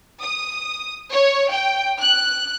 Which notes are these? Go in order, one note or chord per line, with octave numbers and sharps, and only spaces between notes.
D#6
C#5
G5
F#6